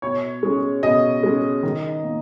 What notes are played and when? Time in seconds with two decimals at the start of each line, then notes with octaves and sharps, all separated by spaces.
0.02 B2 C#5
0.43 G#3 C#4
0.83 B2 D#5
1.23 G#3 C#4
1.63 D#3
2.04 A#3